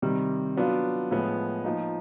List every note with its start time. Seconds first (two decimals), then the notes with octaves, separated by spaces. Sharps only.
0.02 C3 D#3 G3
0.57 F#3 B3 D4 F4
1.11 A2 F3 G#3 B3
1.64 F3 A#3 D#4